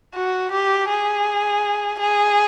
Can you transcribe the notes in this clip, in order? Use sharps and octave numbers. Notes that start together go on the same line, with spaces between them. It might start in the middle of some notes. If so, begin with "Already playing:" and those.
F#4
G4
G#4
G#4